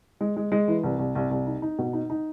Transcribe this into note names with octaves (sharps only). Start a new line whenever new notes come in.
G#3
G#3
G#3
E3
C2
C2
C2
C2
D#4
D#4
B2
D#4
D#4